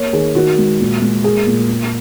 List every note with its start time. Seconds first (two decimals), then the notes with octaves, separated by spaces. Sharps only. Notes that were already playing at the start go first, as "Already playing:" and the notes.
Already playing: A#3 C#5
0.13 D#3 G#4
0.35 D#3 F#4
0.58 G#3
0.80 A#2
1.02 G#3
1.24 A#3 G#4
1.47 A#2
1.70 A#3